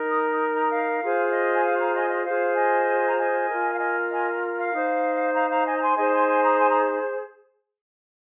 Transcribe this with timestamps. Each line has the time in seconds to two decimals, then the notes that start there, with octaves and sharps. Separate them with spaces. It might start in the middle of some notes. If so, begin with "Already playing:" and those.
Already playing: D#4 A#4
0.09 D#6
0.32 D#6
0.55 A#5 D#6
0.71 F5
1.01 F4 G#4 C5
1.32 D#5
1.54 G#5
1.64 F5
1.79 F5 A#5
1.95 D#5 G#5
2.10 D#5
2.25 F4 G#4 C5 F5
2.56 D#5 G#5
3.09 A#5
3.18 D#5 G#5
3.49 F4 A#4
3.74 F5
3.80 D#5 G#5
4.11 D#5 G#5
4.58 F5
4.73 D#4 C5
5.35 F5 A#5
5.50 F5 A#5
5.66 D#5 G#5
5.76 A#5
5.81 G#5 C6
5.97 D#4 G#4 C5 D#5 G#5
6.12 G#5 C6
6.27 G#5 C6
6.43 A#5 D#6
6.59 G#5 C6
6.69 A#5 D#6